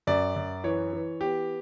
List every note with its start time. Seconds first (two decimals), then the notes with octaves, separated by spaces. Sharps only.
0.07 F#2 D5
0.36 F#2
0.64 E3 C#5
0.93 E3
1.21 B3 G4